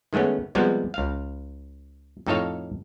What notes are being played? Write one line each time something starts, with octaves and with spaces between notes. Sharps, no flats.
D#3 G#3 A3 B3 C#4
C3 F3 G3 G#3 B3
C#2 F5
F2 A2 D#4 A4 C#5 F5